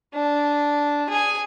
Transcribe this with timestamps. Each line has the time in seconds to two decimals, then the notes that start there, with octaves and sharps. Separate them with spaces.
0.15 D4
1.10 G#4 G#5